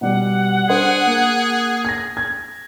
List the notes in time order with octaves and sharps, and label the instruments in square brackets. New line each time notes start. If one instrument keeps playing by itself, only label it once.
[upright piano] B2 G3 [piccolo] F#5
[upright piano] D4 C5 [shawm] G#4
[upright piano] A#3
G#6 A#6
G#6